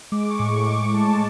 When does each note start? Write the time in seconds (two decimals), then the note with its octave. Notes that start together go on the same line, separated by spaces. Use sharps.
0.12 G#3 D6
0.30 C#6
0.39 A2
0.49 C#6
0.60 D6
0.66 A2 C#6
0.94 G#3 A5